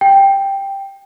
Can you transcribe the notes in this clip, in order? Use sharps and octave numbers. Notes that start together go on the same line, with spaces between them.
G5